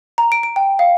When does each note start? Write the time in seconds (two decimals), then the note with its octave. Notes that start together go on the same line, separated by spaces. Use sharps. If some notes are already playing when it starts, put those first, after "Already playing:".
0.18 A#5
0.32 D7
0.43 D7
0.56 G5
0.79 F5